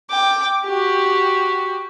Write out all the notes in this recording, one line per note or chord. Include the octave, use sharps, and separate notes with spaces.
G5 D6
F#4 G4